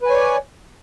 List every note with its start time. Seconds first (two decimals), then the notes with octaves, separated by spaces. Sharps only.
0.02 B4
0.06 G#5
0.10 C#5
0.14 D5